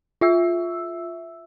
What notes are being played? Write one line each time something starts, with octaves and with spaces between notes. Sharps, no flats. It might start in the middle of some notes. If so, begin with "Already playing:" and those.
F4 E5 E6